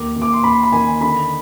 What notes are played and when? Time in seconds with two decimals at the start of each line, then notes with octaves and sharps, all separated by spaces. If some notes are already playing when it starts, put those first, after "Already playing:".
Already playing: D#2 D6
0.16 D#2
0.22 D6
0.33 C6
0.44 D#2 B5
0.63 B5
0.72 D#3 G#5
1.01 D3 B5